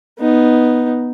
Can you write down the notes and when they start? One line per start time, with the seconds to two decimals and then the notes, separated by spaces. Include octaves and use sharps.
0.19 B3 D#4